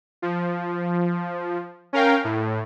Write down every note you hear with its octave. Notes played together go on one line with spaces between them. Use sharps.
F3
C#4 A#4 F5 G5
A2